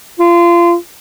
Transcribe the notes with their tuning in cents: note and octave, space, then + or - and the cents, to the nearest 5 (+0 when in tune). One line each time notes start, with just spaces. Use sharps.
F4 -25